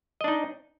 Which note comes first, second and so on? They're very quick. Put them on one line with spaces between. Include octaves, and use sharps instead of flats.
D#5 D4 D#4